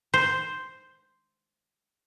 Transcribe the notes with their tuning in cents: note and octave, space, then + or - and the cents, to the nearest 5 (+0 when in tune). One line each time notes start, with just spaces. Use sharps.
C5 +0